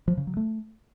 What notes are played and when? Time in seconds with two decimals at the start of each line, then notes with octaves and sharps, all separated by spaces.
0.08 F3
0.17 C#3
0.27 F#3
0.37 A3